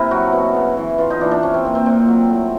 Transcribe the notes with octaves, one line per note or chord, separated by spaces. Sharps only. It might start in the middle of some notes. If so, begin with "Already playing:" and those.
Already playing: C3 E4 A#4
F#3 F#4
B2
C#3
E3
E3 F4
D#4
E3 D4
D4
C3 C#4
C4
C3 A#3
C4
A#2 C4
F#3
A2